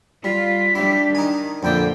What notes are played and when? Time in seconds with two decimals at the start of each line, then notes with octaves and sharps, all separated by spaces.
0.24 G3 F4 B6
0.75 G3 D4 E4 G4
1.15 D#3 D#4 G#5
1.63 F2 A#2 D3 F3 E4 D5 G5